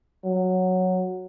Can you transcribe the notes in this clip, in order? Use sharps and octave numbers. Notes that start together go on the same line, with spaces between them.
F#3